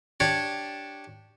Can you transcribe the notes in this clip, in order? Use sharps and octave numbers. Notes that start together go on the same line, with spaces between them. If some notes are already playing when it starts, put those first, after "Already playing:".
D4 G4 C#5